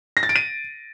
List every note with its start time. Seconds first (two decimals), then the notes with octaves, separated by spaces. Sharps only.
0.17 A#6
0.23 A6
0.29 D7
0.36 D#7